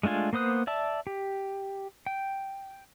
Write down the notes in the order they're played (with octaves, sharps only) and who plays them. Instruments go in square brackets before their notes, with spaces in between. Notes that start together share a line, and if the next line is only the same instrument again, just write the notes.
[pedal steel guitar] G#3 A3 D4 F4 G#5
A#3 B3 C5 D#6 F#6
D5 E5 A5
G4
G5